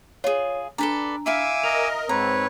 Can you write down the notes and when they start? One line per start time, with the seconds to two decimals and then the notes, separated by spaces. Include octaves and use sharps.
0.24 F4 G#4 C#5
0.78 D4 A4 B4 D5 A#5
1.26 E4 E5 F5 G#5 D6 E6
1.64 A#4 D#5 F7
2.09 G#2 C4 B4 C#5 A#5